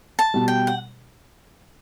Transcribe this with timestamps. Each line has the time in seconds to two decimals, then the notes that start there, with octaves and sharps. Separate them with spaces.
0.19 A5
0.34 B2 G3
0.48 G5
0.67 F#5